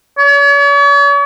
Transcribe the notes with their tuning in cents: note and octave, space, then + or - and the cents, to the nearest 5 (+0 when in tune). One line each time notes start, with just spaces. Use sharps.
C#5 +45